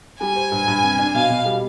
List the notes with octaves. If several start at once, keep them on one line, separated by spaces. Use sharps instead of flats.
G3 G#5
C5
G2
G2
C3
D4
B2 F5
B2
G3